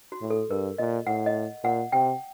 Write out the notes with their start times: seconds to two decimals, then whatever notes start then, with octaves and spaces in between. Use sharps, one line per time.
0.12 F#4
0.22 A2
0.30 A4
0.50 G2 A#4
0.78 A#2 D#5
1.07 A2 F#5
1.26 D#5
1.63 A#2 F#5
1.92 C3 G5